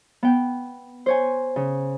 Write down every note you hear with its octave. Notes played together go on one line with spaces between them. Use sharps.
B3 G5
C5 C#5 G#5
C#3